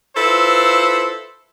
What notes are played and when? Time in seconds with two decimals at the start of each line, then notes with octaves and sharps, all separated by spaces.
0.16 E4 F4 A4 B4 C5